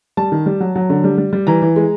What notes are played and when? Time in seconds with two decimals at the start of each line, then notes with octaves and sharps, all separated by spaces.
0.17 G3 A5
0.32 D#3
0.46 G3
0.60 F#3
0.76 F#3
0.90 D3
1.04 G3
1.18 G3
1.33 G3
1.47 E3 A#5
1.62 E3
1.76 G#3